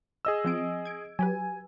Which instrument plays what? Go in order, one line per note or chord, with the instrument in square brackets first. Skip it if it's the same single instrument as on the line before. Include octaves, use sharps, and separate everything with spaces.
[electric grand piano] G#4 D#5 E6
[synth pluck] F3 C4 D7
G#6 D7
[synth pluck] F#3 G4 B4 [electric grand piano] G#5